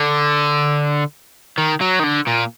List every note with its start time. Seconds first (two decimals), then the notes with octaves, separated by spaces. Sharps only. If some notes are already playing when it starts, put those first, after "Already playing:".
Already playing: D3
1.58 D#3
1.81 F#3
1.99 D#3
2.03 D3
2.27 A#2